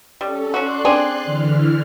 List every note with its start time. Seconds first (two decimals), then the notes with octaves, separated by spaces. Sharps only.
0.21 G3 C#4 A4
0.54 C#4 F#4 D5 C6 F#6
0.85 C4 D4 G#4
1.24 D3 E3 F6